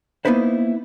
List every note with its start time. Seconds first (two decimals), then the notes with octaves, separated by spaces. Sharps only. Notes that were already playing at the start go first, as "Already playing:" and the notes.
0.25 A#3 B3 D#4 E4 B4 C5